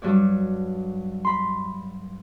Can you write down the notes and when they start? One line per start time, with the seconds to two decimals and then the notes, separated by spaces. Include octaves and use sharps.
0.02 G2 F#3 C#5 D5
1.25 B5 C6